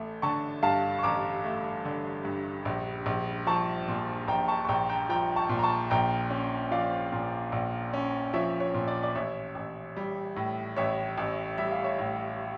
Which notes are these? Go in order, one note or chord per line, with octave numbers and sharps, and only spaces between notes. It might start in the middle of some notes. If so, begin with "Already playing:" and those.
Already playing: A1 A3
D3 A5 C#6
G2 F5 A5
C#6
A1 A#5 D6
A3
D3
G2
A#1
A#1
F3 A5 C#6
A#2
A#1 G5 A#5
A5 C#6
C#6
A#1 G5 A#5
G5 A#5
F3 G5 A#5
A5 C#6
A#2
A#5
A5 C#6
A#1 G5 A#5
C#4
F3 D5 F5
A#2
A#1
C#4
F3 C#5 E5
C#5
A#2
D5
D5
A1 C#5 E5
A1
G3
A2
A1 C#5 E5
A1
G3 E5
F5
C#5 E5
A2